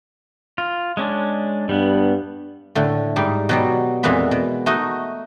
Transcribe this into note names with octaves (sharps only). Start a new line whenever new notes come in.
F4
G#3 C#4 D4
G2 G3 B3
A2 D3 A3
G#2 G3 D#4
B2 F#3 G3
F2 A#2 E3 G#3 B3 B5
B2
A3 D#4 F#4 D#5